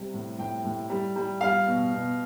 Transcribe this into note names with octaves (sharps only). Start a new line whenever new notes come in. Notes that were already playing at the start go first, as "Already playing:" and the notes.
Already playing: C3 G3
A2
A2 G5
A2
G3
G3
G3 F5
B2
B2